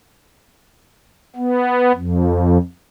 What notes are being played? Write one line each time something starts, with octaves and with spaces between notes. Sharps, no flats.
B3
F2